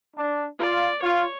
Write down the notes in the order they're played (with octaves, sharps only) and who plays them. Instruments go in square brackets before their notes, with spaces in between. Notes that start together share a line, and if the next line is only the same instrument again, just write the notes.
[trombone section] D4
[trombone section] F4 [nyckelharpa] D5
[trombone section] F4 [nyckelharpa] C#5